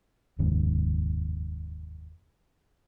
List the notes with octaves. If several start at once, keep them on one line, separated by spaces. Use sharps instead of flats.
F1 D#2 G#2 C#3